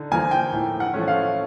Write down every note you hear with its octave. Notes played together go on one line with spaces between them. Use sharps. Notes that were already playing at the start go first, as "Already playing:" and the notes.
Already playing: D3 D#4
F3 A#3 D#4 G#5
G5
A2
F#5
F3 A3 C#4
F5